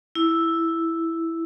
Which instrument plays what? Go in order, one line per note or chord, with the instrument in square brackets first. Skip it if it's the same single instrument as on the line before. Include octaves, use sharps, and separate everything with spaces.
[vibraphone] E4